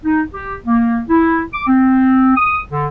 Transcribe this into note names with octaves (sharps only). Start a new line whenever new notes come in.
D#4
G4
A#3
E4
D6
C4
D#6
D3